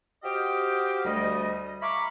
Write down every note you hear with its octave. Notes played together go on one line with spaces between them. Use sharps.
F#4 G4 C5 D#5 F5 G5
D2 G3 A3 D#5
E5 F5 A#5 B5 C#6 D6